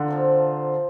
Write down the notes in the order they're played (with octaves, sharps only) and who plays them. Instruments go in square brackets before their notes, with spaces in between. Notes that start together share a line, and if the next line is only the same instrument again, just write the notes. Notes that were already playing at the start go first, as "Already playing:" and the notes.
Already playing: [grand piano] D3 [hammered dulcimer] A#3 F4
[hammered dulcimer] A#2 F3 C4